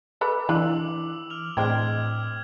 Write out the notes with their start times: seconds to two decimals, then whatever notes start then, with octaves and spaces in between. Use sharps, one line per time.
0.21 A4 B4 B5 D6
0.49 E3 D4 F4 D6 E6 F#7
1.30 F6 F7
1.57 A2 G#3 C4 D4 D6 F6 G#6